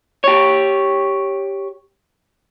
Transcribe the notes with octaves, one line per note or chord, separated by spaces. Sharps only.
G4 C#5